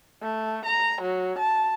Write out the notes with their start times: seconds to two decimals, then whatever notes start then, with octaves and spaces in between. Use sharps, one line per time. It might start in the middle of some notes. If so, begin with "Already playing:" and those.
0.22 A3
0.66 A#5
1.02 F#3
1.39 A5